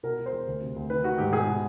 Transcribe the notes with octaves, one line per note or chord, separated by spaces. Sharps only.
B2 A#4
B2
C5
E2
D2
C3
D2
D#3 B4
D#3 F#4
G#2 G4
B2 G#4
B2